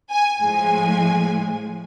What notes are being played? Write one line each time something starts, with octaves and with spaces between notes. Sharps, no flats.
G#5
A2 F3 G#3 G#5